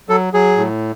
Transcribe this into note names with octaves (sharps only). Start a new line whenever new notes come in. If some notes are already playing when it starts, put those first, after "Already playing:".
F#3 A4
F#3 G#4
A2